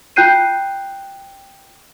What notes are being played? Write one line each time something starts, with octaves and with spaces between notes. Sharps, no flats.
F4 G5 F#6 G6 C7 D#7